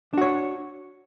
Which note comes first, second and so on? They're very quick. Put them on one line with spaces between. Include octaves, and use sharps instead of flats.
D4 F#4 C#5